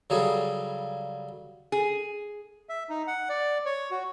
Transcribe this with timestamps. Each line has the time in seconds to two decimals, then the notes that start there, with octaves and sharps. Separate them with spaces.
0.10 C#3 F#3 G3 G#4 A4
1.72 G#4
2.69 E5
2.89 D#4
3.07 F#5
3.29 D5
3.65 C#5
3.91 F#4